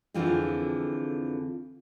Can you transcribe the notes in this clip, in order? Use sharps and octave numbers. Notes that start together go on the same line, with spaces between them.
F2 D3 E3 F3 C4 G#4